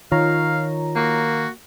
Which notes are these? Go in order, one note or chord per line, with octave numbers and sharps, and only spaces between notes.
D#3 F4 C#5 F5 A#5
A#3 F#4